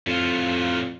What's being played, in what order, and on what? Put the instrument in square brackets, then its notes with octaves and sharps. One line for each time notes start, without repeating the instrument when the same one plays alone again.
[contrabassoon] F2 [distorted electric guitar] A2 F4